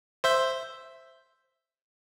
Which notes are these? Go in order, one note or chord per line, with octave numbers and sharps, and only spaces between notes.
C5 E5 G6